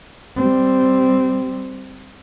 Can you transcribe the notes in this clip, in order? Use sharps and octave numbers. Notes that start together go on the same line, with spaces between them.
G3 C4